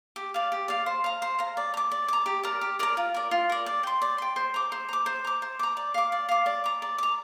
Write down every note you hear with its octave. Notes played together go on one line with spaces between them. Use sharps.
G4
D5 F5
G4
D5 F5
C5
F5 A#5
C5
F5 A#5
D5
A#5
D6
D5
A#5 D6
G4
A#4 D5 A#5
G4
A#4 D5 A#5
F4
A#4 D5
F4
A#4 D5
D5
G5 C6
D5
G5 C6
C5
A#5 D6
C5
A#5 D6
C5
A#5 D6
C5
A#5 D6
D5
F5 D6
D5
F5 D6
D5
A#5 D6
D5
A#5 D6